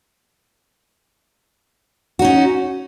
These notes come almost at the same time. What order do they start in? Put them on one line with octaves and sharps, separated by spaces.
F#4 D#4 C#4